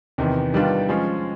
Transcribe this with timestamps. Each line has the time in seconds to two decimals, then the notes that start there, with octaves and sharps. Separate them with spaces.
0.18 E2 C3 D#3
0.54 D#3 G3 B3 D4 F4
0.89 F3 G#3 C#4